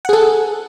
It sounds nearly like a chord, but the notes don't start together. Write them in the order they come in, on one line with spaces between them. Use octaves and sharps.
F#5 G#4 A4